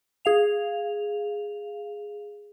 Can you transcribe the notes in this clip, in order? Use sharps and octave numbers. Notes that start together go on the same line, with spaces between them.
G#4 F5 F7